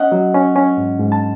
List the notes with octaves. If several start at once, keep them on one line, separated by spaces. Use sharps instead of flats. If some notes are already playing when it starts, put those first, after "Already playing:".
Already playing: C#4 D#5 F#5
F#3
C#4
C#4
G#2
G#2
A5